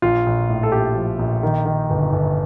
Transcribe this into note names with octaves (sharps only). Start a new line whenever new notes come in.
A#1 F4
A#1
A2
A4
A#1 G4
F3
A#1
D#3
D#3
G1
G1